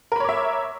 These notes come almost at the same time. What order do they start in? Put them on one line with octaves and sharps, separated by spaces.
A#4 B5 C#5 D6 E5